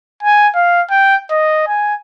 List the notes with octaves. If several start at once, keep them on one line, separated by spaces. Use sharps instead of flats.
G#5
F5
G5
D#5
G#5